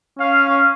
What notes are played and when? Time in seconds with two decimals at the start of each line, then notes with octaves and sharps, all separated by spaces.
0.19 C#4 F5
0.49 C#4